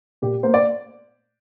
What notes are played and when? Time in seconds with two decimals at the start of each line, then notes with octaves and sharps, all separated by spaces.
0.22 A#2 G4
0.43 A#3 C5
0.54 D5